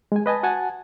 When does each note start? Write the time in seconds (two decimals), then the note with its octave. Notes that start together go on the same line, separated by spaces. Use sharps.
0.12 G#3 G#5
0.26 B4 D#5 G#5 A5
0.43 F#4 F#5 G#5 A5